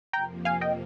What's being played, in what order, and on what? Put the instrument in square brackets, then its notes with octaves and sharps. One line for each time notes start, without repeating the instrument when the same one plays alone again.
[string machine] F2 C3 F3 A#3 [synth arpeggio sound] G5 A#5
[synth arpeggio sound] F5 G#5
D#5 G5